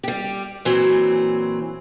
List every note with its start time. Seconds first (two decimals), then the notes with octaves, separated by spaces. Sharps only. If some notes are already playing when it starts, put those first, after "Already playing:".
0.03 G3 G4
0.65 A#2 E3 F#3 C4